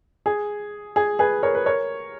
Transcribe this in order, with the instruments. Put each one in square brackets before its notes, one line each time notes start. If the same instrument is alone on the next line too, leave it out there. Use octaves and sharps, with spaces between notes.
[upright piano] G#4
G#4
G#4 B4
A#4 C#5
B4
A#4 C#5